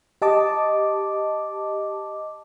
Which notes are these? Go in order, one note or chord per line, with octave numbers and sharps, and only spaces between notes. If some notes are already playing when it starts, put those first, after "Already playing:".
G4 D#5 A5 D6